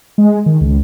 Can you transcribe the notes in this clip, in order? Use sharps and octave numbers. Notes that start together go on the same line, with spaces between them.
G#3
D#3
C#2